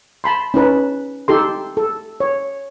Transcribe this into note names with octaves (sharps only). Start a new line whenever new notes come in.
A5 B5 C6
C#4 D#4 B4 A5
D#4 G4 A4 C6
A4
C#5